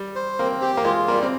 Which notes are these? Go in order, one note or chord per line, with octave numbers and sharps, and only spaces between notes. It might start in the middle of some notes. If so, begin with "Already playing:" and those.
Already playing: G3
C5
A#3 C4
G4
A#3
G#3 F4
G3 A#3
C4